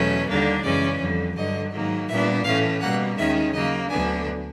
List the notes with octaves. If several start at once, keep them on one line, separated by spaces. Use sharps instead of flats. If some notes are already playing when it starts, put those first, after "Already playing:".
Already playing: E2 B2 F#3 A3 C#4
D#2 D3 G3 A#3 D4
F#2 C#3 E3 G#3 C#4 D5
F2 D3 G3
G2 D3 F#3 D#5
G#2 D#3 F#3 A#3
A#2 G3 B3 D4 E5
A2 E3 A3 C#4 F5
B2 G3 A#3 F#5
D#2 D#3 G#3 C#4 E5
C#3 F#3 A#3 D#5
D2 D3 F#3 B3 D4 G#5